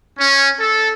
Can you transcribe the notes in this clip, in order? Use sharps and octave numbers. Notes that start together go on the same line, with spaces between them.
C#4
A4